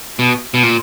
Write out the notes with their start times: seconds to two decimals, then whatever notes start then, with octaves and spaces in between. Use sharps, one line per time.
0.19 B2
0.54 B2
0.63 A#2